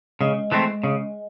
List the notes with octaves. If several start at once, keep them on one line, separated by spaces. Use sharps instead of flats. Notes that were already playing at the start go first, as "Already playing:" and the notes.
C#3 G#3
E3 A3 C4
C#3